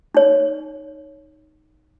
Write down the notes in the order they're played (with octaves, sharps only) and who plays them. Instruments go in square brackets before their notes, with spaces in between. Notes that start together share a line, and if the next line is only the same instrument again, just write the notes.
[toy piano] D#4 C#5